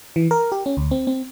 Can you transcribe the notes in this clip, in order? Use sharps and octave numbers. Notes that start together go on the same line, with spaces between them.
E3
A#4
G4
C#4
D2
C4
C4